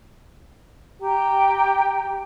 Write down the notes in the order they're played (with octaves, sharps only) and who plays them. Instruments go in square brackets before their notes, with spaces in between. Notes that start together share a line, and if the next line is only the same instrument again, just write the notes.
[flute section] G4 G5 A#5